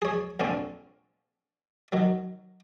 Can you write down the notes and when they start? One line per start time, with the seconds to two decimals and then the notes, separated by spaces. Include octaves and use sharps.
0.02 G#4 C#5
0.40 A#1 D3 C4 C#4
1.92 D#3 F#3